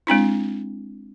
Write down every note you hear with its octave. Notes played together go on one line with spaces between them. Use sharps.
G#3 C4 D4 E4